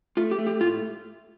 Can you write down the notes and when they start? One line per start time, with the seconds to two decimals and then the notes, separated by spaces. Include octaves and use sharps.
0.17 A3 F4
0.31 G4
0.38 A3
0.47 G4
0.61 A2 F4